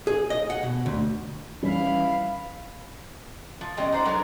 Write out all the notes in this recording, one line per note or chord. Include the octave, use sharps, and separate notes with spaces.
G#4
D#5
F#5
B2
D2
E3 G3 C#4 E4 F5
F3
B2 G#3 C#4 G4 D5 D#5
D#4 C5 F#5
F#3 G#3 D4 A4 A#4